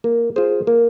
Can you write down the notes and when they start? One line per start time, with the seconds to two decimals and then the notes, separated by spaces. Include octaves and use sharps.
0.04 A#3
0.36 F4 G#4 C5
0.67 A#3